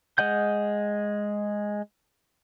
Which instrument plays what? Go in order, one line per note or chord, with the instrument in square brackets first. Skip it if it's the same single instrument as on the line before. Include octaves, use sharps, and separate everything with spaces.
[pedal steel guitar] G#3 D#5 F#5 G6